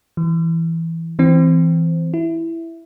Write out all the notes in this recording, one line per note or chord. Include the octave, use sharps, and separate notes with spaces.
E3
E3 C4
E4